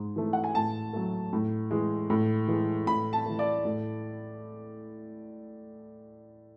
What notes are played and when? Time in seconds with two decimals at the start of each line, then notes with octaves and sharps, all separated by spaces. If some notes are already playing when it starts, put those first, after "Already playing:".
Already playing: G#2
0.16 E3 A3
0.33 F#5
0.44 G#5
0.55 A2 A5
0.93 F#3 A3
1.33 A2
1.71 E3 G#3
2.10 A2
2.48 E3 G#3
2.87 A2 B5
3.13 A5
3.26 E3 A3
3.39 D5
3.65 A2